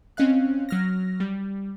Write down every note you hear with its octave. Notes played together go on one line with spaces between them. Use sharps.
C4 C#4 D#5 F5 F#6
F#3 F6 A#6
G3